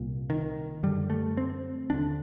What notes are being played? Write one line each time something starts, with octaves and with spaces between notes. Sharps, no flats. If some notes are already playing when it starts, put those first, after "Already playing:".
Already playing: C2 A#2
D#3
F#2 D3 G3
A3
C4
D#2 D3 D4